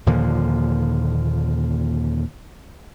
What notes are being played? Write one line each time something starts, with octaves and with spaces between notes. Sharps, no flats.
D#2 A#2 D3 F3